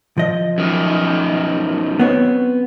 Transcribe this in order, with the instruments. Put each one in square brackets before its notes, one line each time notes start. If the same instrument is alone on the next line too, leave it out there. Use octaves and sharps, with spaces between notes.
[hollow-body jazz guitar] F3 D#5
[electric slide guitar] F#2 D#3
[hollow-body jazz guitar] B3 C4 C#5